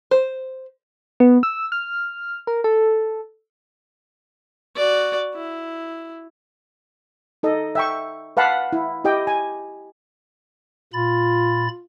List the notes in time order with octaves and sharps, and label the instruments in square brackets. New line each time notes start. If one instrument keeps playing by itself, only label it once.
[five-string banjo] C5
[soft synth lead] B3
E6
F6
A#4
A4
[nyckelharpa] F#4 D5
E4
[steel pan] D#4 A4 D#5
E5 G5 C#6
B4 F5 F#5 A5 B5
E4
E4 G4 D#5 G5
G#5
[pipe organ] A#2 B5 A6 [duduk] F4